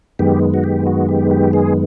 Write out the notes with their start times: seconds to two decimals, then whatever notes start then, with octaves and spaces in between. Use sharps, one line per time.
0.19 F#2 D#3 G#3 B3 G4
0.54 F#4
0.64 G4
0.86 F#4
1.09 G4
1.31 G4
1.53 G#4